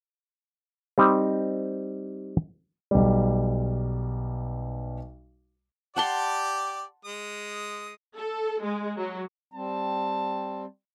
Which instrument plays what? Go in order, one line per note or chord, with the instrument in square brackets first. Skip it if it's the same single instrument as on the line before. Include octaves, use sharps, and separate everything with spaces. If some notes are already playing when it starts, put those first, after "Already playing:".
[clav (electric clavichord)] G3 C4 D#4
[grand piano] B1 G3
[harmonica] G4 D5 [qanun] F#5 A5 C6
[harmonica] G#3 D#6
[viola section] A4
G#3
F#3
[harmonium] G3 C4 [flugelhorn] A5